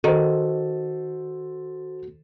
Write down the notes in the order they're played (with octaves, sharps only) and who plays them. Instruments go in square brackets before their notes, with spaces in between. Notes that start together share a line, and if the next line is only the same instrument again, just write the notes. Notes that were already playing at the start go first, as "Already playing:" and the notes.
[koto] D#3 [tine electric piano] F#4 [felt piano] A4 C5